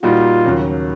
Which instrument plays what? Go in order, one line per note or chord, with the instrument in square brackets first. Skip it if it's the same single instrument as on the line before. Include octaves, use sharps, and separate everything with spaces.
[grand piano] A#2 G3 A#3 D#4 F#4 [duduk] F4
[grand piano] D#2 C#3 F#3